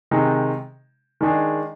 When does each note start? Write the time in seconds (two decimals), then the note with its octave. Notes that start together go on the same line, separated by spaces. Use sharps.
0.11 C3 D#3 G#3 D#4
1.21 D#3 G#3 D4 G#4